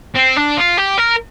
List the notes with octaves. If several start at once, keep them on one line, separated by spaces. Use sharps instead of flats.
C4
D4
F4
G4
A#4